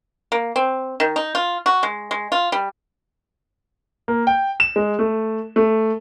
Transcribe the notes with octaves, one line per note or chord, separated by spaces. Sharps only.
A#3
C4
D#3
D#4
F4
F#4
G#3
G#3
F4
G3
A#3
G5
E7
G#3
A3
A3